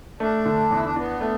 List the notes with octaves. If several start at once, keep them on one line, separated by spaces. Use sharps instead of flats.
A3 D4
D3
E2 E4
D4
B3 D4
A3